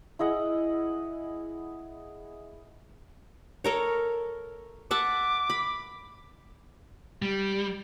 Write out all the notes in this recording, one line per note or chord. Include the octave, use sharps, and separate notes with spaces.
E4 G#4 D#5 F#5
A4 A#4 C#5
E5 F#5 A5 D6
B5
G3